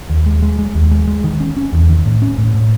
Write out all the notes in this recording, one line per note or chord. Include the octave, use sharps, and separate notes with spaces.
D#2
G#3
G#3
G#3
D#2
G#3
G#3
D#3
C#4
C#4
E2
D#3
A2
C#4
A2
A2